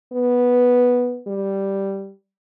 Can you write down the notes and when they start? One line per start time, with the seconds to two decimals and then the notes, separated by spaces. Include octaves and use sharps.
0.13 B3
1.27 G3